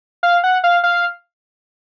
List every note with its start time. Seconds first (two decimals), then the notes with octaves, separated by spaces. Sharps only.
0.23 F5
0.44 F#5
0.64 F5
0.84 F5